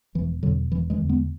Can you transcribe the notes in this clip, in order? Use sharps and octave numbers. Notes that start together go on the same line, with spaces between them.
E1 E3
E2 B2 D3 F#3
E1 E3
E3 G#3
E2 D3
G#3 B3